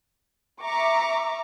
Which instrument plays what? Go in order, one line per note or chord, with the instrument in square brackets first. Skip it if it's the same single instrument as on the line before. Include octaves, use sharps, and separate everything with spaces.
[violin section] E5 A#5 C#6 D6